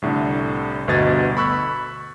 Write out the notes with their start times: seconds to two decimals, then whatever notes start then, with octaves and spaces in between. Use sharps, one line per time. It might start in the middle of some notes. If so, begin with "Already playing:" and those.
0.02 C2 A2 D3
0.88 G1 D2 B2 D#5 G#6 A6
1.37 B5 C#6 E6 F#6 B6